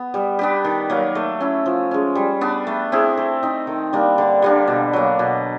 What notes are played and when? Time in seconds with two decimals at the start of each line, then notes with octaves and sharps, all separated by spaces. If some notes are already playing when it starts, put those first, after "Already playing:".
Already playing: B3
0.14 G3
0.39 B3 D4 G4
0.65 D#3
0.90 F#3 A#3
1.15 A3
1.40 C#4 E4
1.66 F3
1.91 G#3 C#4
2.15 G3
2.41 B3 D4
2.67 A3
2.92 C4 E4 G#4
3.17 A3
3.43 C4 D#4
3.67 D#3
3.93 G3 A#3 D4
4.18 D3
4.42 G3 A#3 D4
4.68 B2
4.93 F#3 A#3
5.19 B2